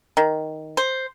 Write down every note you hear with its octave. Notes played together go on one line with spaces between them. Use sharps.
D#3
C5